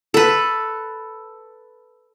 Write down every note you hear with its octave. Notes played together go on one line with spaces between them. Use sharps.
A4 B4